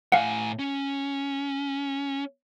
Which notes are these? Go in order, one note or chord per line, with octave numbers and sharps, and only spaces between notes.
A2 F5 F#5 G#5
C#4